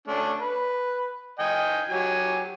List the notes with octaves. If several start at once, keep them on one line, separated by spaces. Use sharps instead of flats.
A3 C#4 D4
B4
D#5 G5 G#5
F#3 G4 G#5